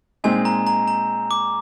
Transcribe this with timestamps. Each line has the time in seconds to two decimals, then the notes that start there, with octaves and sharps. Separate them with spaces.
0.24 A#2 G#3 C4 D#4 G#5
0.45 A#5
0.67 A#5
0.88 A#5
1.31 D6